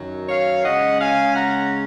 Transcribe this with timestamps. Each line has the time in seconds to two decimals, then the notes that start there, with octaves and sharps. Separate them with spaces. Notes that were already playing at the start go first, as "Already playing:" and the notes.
Already playing: F#2 D#3 F#3
0.28 C#5 F5
0.64 C#3 G#3 C#4 D#5 F#5
1.00 F5 G#5
1.35 F#5 A#5